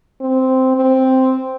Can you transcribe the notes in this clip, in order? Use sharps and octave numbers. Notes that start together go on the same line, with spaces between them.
C4
C4